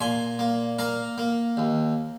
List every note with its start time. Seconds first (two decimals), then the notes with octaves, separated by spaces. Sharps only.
0.01 A#2 G#5 C6
0.39 A#3
0.79 A#3 F5 A#5
1.18 A#3
1.57 D#2